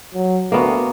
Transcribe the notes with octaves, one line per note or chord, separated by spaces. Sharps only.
F#3
D2 A#3 B3 F#4